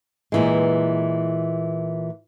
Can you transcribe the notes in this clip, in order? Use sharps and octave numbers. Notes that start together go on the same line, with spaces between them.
A#2 E3 G#3